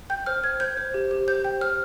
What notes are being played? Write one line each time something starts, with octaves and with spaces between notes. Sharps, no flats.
G5 G6
C5 F6
C5 G#6
C5 G6
C5
G4
G4
C5 G6
G5
C5 F6